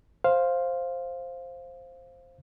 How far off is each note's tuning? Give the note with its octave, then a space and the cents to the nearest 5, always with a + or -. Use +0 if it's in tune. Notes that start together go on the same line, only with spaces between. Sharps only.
C5 +5 F5 +0